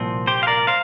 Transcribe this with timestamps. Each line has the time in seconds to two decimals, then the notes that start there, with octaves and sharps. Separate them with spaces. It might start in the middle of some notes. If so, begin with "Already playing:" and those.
Already playing: C2 A#2 F3 C4
0.27 G4 C5
0.43 F5
0.47 A#4 D5
0.67 C5 F5